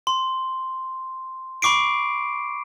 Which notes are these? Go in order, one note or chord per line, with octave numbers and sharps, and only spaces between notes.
C6
B5 C#6 D6 C7 D7